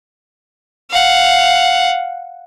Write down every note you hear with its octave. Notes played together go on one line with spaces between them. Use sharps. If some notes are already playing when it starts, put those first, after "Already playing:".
F5 F#5